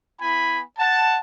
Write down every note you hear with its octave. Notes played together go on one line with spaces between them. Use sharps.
B3 E4 G#5 B5
F#5 A5